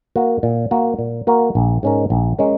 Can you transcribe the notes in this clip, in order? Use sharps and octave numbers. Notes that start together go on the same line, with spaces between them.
A#3 F#4 A#4
A#2
A#3 F#4 A#4
A#2
A#3 F#4 A#4
A#1
G#2 G#3 C#4 A#4
A#1
G#3 C#4 A#4